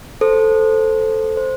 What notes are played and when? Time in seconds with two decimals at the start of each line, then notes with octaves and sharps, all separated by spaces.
0.21 A4 C5
1.37 C5